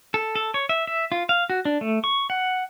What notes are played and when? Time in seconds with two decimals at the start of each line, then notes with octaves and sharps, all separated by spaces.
0.14 A4
0.35 A4
0.54 C#5
0.69 E5
0.87 E5
1.12 F4
1.29 F5
1.50 F#4
1.65 D4
1.81 A3
2.04 C#6
2.30 F#5